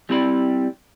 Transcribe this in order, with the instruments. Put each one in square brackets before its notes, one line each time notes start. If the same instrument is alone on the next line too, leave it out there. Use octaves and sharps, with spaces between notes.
[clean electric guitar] G3 C4 E4 D5 B5